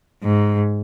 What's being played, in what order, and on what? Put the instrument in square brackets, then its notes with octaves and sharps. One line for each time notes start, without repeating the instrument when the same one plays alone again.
[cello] G#2